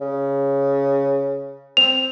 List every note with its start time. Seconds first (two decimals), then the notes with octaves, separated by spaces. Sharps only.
0.01 C#3
1.77 C4 F7